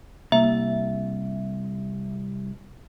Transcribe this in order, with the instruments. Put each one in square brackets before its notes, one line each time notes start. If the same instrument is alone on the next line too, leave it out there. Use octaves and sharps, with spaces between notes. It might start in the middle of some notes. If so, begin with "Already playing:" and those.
[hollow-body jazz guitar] C2 [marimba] A#3 [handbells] E5